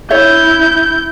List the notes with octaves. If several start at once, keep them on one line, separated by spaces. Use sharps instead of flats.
E4 C#5 E5 G6